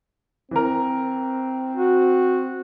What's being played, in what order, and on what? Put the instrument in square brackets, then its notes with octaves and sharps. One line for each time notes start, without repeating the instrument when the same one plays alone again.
[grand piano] E3 A#4 [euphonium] C4
[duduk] F#4